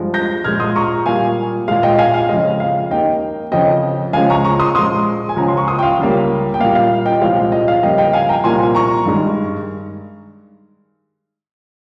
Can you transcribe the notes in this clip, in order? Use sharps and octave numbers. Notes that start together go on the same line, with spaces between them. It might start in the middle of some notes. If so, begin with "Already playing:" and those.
Already playing: G2 F3 G#3
G6 A#6
A#2 F3 G#3 F6 G#6
C6 D#6
A#5 C#6
A#2 G3 A#3 F5 G#5
A#2 G#3 F5
D#5 G5
F5 G#5
F5
F2 C#3 G#3 D#5
F5
D#2 D#3 A#3 D#5 G5
F2 C#3 F3 D#5 G5
C#2 C#3 F3 G#3 F5 G#5
A#5 C#6
A#5 C#6
C6 D#6
A#2 F3 G#3 C6 D#6
G#5
C#2 C#3 F3 A#5
C6
C#6
C6 D#6
G5
F5
C#2 C#3 G3 A#3
G5
A#2 G3 A#3 F5
F5
D#5 G5
C2 A#2 F3 G#3 F5
D#5
F5
F2 C#3 G3 A#3 D#5 G5
D#5 G5
F5 G#5
G5 A#5
C2 A#2 F3 A#3 G#5 C6
A#5 C#6
G2 D#3 G#3